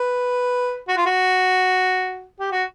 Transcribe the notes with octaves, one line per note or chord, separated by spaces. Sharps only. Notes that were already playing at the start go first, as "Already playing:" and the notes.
Already playing: B4
F#4
F4
F#4
G4
F#4